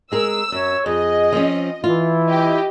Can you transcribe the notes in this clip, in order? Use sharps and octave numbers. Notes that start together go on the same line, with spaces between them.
G#3 G#4 A#4 E6
F#2 C#5
F2 G#4 D#5
F3 C4 C#4
E3 E4 F4
G4 D#5